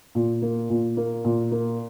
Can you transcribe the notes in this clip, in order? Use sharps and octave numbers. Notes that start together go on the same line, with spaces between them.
A#2
A#3
A#2
A#3
A#2
A#3